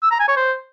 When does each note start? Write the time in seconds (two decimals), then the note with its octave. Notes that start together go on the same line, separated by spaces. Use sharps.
0.03 E6
0.11 A#5
0.20 G#5
0.28 C#5
0.36 C5